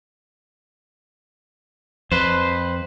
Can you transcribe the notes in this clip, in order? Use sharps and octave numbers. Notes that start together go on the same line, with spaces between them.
F2 B4 C5